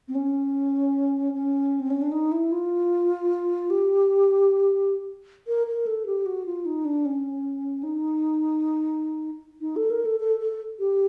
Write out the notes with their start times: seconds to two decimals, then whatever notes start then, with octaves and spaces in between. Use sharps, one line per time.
0.08 C4
0.15 C#4
1.33 C#4
1.80 C4
1.90 C#4
2.01 D4
2.12 D#4
2.32 E4
2.52 F4
3.70 G4
5.47 A#4
5.67 A#4
5.87 A4
6.06 G4
6.26 F#4
6.46 F4
6.65 D#4
6.85 D4
7.05 C#4
7.83 D#4
9.61 D#4
9.76 A4
9.90 A#4
10.05 A4
10.20 A4
10.40 A4
10.79 G4